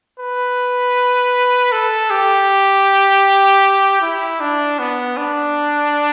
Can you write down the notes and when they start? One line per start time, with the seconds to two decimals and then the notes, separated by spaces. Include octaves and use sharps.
0.20 B4
1.72 A4
2.10 G4
4.02 E4
4.40 D4
4.79 B3
5.17 D4